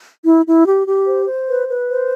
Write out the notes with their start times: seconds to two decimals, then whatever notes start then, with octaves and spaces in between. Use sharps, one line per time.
0.24 E4
0.45 E4
0.65 G4
0.86 G4
1.06 C5
1.27 C5
1.48 B4
1.67 B4
1.89 C5